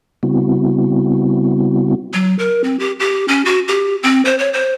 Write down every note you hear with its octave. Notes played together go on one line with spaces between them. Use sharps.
C#3 G3 B3 C4 E4 F#4
F#3
A#4
C4
G4
G4
C#4
F#4
G4
C4
C5
C#5
C5